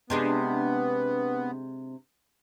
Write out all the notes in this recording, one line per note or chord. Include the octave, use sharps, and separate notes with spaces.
C3 G#3 B3 D4